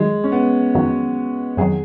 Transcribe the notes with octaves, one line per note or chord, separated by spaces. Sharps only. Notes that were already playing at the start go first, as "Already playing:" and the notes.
Already playing: F2 D#3 F#3 G#3
C#4
B3
F2 D#3 F#3 F#4
F2 D#3 F#3 G#4